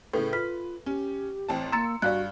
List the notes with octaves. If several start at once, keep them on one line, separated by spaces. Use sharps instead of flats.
A2 C#3 A4 B4
F4 B4 F6 B6
C#4 G4
A1 C4 A5
A#3 A#5 C6 E6 A6 C#7
G2 F#4 D5 F5 F#6